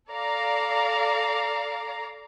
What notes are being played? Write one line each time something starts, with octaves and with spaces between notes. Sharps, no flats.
A4 D5 F5 A#5